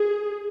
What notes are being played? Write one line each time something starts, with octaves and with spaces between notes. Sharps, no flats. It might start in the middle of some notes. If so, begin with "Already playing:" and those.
Already playing: G#4